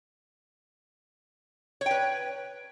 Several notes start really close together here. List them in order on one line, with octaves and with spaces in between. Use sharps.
C#5 G5 B4